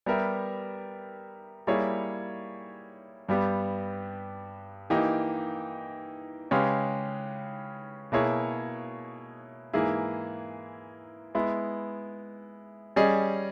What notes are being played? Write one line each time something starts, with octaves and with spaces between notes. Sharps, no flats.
G3 B3 G4 A#4 E5
G3 A#3 E4 G#4 C#5
G2 G3 B3 G4
E3 A#3 D#4 G4
C#3 G#3 C#4 G4 B4
B2 A#3 E4 G#4 C#5
G#2 E3 A#3 E4 G#4
G#3 B3 E4
G3 C#4 G#4 D#5